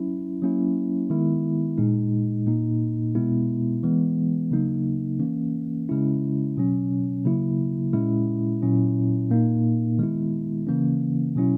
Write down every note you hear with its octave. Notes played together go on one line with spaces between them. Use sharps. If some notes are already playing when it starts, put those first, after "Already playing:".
Already playing: F#3 C#4 E4
F#3 A#3 C#4 E4
D#3 G#3 B3 E4
A#2 G#3 D#4
A#2 A#3 D#4
B2 G#3 B3 E4
E3 G#3 B3
C#3 F#3 A#3 D#4
E3 A#3 C#4
C#3 G#3 C#4 E4
B2 F#3 C#4
C#3 F#3 A#3 E4
A#2 G#3 C#4 E4
A#2 F#3 C#4 E4
A#2 A#3 D#4
D#3 G#3 B3 E4
C#3 E3 A#3 C#4
B2 F#3 C#4 E4